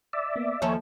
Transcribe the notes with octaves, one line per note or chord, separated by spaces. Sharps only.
D5 E5
A#3 B3
D#2 F3 A4 C#5 E5 G#5